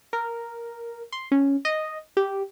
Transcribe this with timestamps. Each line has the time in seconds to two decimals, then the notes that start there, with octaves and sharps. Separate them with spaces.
0.13 A#4
1.12 C6
1.32 C#4
1.65 D#5
2.17 G4